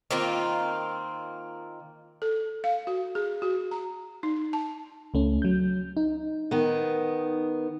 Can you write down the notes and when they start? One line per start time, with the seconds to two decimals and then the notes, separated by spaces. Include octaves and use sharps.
0.11 D#3 A#3 C4 F4
2.22 A4
2.64 F5
2.87 F#4
3.15 G#4
3.42 F#4
3.71 A#5
4.23 D#4
4.53 A5
5.14 C#2 A3 C#4
5.42 F#3 G6
5.97 D#4
6.51 D#3 B3